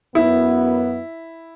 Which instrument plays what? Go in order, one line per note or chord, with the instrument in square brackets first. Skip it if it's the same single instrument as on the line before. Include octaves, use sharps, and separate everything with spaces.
[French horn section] F#2 B3 [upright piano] E4